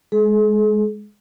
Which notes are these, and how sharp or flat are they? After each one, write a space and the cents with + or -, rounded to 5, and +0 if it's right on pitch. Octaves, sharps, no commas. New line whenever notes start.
G#3 +0 G#4 +45